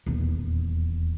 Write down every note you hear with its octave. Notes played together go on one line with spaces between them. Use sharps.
D#1 E2